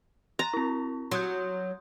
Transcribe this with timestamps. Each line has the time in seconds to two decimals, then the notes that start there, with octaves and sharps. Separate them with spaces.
0.39 A#5 C6 A6 A#6
0.53 C4 E4
1.11 F#3 C6 D#6 G6